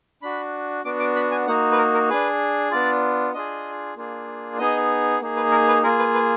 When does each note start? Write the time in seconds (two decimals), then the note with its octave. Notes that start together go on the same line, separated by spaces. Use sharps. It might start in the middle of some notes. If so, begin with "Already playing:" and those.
0.22 D4 F#4 B5
0.85 B3 D4 F#4 D6
1.00 D6
1.16 B5
1.31 G#5
1.47 A#3 D#4 F#4 F#5
1.72 B4
1.78 A#4
1.94 A#4
2.09 D4 G#4 B4
2.71 B3 D4 F4 D5
3.34 D4 F4 G#4 D#5
3.96 A#3 D4 F4 G#4
4.58 B3 D#4 G#4 D#5
5.21 A#3 D#4 G#4
5.37 B4
5.51 A#4
5.68 B4
5.83 A#3 F4 G#4 A#4
5.99 B4
6.14 B4